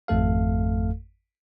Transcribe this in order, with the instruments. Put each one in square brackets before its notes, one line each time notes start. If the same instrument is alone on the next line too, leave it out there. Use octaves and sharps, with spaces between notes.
[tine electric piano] G#1 F2 A3 A4 F5